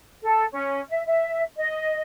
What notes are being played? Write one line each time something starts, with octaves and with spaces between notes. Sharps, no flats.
A4
C#4
E5
E5
D#5